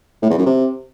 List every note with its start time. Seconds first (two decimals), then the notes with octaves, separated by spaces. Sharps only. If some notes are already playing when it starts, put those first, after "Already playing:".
0.22 A2
0.30 E2
0.38 F#2
0.46 C3